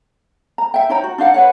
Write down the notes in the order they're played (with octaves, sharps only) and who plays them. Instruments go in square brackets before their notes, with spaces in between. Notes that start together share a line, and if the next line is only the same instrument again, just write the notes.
[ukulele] A#5
E5 G5
D#4 C#5 G5 A#5
F#4
D4 D#4 F5 F#5
B4 C#5 F#5